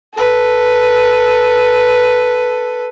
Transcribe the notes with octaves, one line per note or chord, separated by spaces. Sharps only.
A4 B4